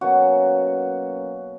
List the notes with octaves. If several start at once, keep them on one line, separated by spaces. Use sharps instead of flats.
B2 F#3 A#3 C#4 F#4